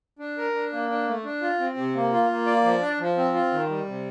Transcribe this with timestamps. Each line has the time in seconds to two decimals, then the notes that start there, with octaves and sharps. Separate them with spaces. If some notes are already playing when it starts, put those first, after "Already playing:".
0.19 D4
0.38 A#4
0.54 D4
0.72 A#3
0.89 D4
1.07 A3
1.24 D4
1.42 F4
1.59 C4
1.77 C3
1.95 A#3
2.12 F4
2.29 A#3
2.46 D5
2.64 F3
2.81 D4
2.99 F3
3.17 C4
3.34 F4
3.52 D#3
3.69 G3
3.86 C3